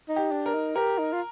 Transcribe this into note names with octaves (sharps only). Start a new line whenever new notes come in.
D#4
G4
D4
A#4
D#4
G4 A#4
D#4
F4